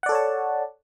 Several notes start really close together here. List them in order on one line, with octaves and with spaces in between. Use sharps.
F#5 D5 A4 C#5 A5